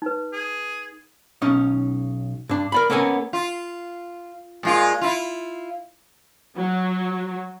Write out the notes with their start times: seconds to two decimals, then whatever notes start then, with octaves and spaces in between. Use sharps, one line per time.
0.02 D#4 B4
0.33 G#4
1.42 B1 C#4 D#4
2.49 G2 D4
2.72 A#4 D5 B5
2.90 A#3 B3 C#4 A4 A#4 G#5
3.33 F4
4.63 A#2 G#3 F4
5.01 E4 F4
6.56 F#3